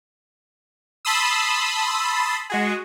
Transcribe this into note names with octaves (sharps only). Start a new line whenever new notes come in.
A5 B5 C6 D#6 E6
G#3 F#4 G#4